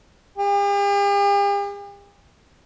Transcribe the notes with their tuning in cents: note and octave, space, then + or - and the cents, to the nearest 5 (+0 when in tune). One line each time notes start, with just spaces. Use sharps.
G4 +45